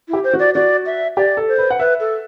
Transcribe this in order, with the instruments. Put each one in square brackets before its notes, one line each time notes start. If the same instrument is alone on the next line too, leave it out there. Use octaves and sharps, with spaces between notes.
[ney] E4 [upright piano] G4
[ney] C5
[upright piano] F#4
[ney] D5
[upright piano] F#4 [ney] D5
[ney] E5
[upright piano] G4 [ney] D5
[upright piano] A4
[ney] C5
[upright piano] B4
F#5
[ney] B4 [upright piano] E5
[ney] A4